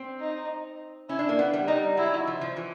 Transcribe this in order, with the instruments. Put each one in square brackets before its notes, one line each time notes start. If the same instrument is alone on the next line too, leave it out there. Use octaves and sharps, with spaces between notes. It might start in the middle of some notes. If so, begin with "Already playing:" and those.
Already playing: [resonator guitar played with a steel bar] C4
[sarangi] D#4
[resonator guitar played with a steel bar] C#4 [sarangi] E4
[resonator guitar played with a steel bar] D4
A#3
B3
G3
[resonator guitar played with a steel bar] G3 [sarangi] D#4
[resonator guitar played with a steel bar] F#3 [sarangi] E4
[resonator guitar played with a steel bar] F3
F3
E3